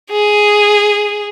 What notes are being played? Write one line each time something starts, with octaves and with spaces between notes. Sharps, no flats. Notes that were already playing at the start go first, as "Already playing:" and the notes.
G#4